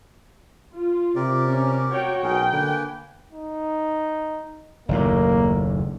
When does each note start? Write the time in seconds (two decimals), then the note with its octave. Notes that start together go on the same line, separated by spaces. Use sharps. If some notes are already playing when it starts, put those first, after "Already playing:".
0.75 F4
1.15 C3 G4 A#4 D5
1.48 C#4
1.90 F#4 C#5 G5
2.23 B1 C#4 G#4 A#4 G5
2.53 D3 A#3 B4 G#5
3.32 D#4
4.89 F#1 D#2 A2 A#3